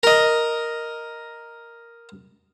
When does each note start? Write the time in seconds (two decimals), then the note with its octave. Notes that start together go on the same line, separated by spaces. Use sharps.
0.03 A#4 D#5